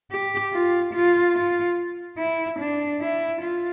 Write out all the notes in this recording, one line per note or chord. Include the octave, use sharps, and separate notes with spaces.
G4
F4
F4
F4
E4
D4
E4
F4